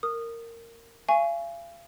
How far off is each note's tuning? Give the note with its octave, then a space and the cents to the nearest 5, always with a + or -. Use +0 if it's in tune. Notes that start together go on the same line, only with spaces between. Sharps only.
A#4 -15 D#6 -15
F5 -40 G#5 +0 C#6 +0